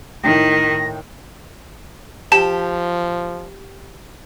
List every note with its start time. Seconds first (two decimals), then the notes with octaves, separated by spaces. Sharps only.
0.24 A2 D#3 D#4 G5 A#6
2.32 F3 G4 A5